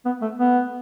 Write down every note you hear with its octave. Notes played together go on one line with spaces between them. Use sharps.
B3
A3
B3